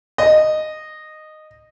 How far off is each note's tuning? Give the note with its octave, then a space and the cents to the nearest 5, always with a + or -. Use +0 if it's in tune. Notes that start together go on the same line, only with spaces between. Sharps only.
D#5 -10